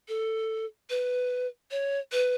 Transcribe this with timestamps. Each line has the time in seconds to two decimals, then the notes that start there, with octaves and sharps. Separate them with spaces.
0.08 A4
0.90 B4
1.71 C#5
2.12 B4